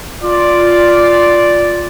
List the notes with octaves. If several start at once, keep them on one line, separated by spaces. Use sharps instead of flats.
F4 D5